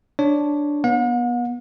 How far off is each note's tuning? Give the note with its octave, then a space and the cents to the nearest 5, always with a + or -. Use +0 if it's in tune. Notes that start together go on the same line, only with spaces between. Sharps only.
D4 +0 C#5 +0
B3 -25 F#5 -45